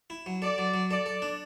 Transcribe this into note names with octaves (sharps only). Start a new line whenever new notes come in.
E4
F#3
A4 D5
F#3
F#3
A4 D5
A4
D4